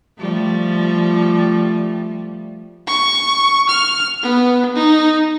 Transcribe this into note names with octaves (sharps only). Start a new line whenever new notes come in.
F3 G3 A3
C#6
F6
B3
D#4